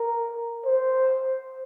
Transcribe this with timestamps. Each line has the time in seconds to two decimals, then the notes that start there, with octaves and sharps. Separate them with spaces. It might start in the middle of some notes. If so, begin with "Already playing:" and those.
Already playing: A#4
0.66 C5